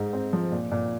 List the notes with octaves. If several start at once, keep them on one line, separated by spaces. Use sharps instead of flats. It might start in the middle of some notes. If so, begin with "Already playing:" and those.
Already playing: G#2 D#4
C4
F3
A#2
A#2